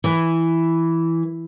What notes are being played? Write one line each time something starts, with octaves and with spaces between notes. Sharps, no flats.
E3